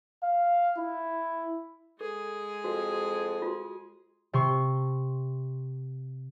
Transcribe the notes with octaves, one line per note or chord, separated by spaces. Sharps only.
F5
E4
G#3 G#4 A4
F2 F#4
F4 F#4
C3 C6 C#6